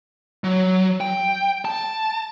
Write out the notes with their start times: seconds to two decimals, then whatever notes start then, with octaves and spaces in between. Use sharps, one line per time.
0.44 F#3
1.01 G5
1.65 A5